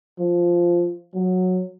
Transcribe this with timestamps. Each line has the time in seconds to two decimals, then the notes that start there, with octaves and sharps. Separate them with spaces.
0.19 F3
1.14 F#3